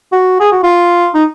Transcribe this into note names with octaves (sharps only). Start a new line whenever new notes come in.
F#4
G#4
F#4
F4
D#4